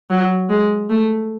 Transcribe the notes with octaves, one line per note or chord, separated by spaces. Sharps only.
F#3
G#3
A3